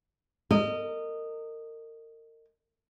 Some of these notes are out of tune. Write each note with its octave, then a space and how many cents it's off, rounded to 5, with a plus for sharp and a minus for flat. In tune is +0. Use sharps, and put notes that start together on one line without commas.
A#4 -35 D#5 -15